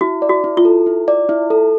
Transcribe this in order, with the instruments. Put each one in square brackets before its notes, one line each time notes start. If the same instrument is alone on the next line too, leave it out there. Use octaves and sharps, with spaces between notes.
[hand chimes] E4 [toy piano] F#4
[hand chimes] D5
[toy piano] F#4
[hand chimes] E4
[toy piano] F4
[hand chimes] A4
E4
D5
E4
A4